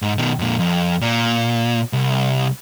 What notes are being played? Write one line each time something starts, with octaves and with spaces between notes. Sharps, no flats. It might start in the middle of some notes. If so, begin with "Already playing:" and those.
G#2
B2 D#3
F2 A#2
F2
A#2
C2